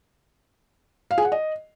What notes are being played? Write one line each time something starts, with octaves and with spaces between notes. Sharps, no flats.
F5
G#4
F#5
D#5